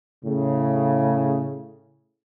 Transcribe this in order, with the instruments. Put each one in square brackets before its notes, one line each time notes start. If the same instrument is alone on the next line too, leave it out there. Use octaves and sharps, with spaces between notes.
[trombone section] A2 C#3